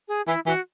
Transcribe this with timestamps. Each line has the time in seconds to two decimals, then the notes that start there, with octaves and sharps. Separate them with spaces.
0.08 G#4
0.26 E3 E4
0.46 E3 F#4